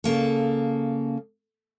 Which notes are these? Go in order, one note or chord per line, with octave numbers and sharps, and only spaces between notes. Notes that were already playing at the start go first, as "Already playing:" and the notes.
C#3 A#3 A4